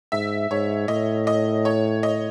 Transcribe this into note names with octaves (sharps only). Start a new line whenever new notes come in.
G#2 E5
G#2 C#5
A2 D#5
D#5
C#5
D#5